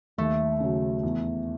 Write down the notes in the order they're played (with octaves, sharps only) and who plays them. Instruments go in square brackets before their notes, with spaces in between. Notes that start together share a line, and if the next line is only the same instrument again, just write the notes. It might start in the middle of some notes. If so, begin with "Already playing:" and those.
[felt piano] D#2 [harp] A3
[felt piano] C#3 F#3
E2